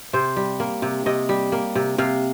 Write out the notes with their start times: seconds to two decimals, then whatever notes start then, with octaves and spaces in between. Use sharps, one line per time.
0.13 C3 C5
0.36 G3
0.60 A#3
0.82 C3
1.06 C3 D#5
1.29 G3
1.52 A#3
1.75 C3
1.98 C3 F5